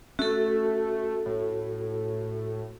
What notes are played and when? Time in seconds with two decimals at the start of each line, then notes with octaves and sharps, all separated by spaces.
0.19 A3 C#4 F#4 A4
1.26 A2